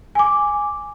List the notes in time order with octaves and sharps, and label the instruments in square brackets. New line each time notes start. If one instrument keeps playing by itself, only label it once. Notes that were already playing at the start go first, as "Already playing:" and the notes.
[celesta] G#5 D6